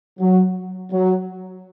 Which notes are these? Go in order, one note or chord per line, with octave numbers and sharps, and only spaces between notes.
F#3
F#3